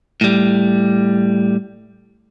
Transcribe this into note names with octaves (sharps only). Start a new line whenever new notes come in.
A2 G3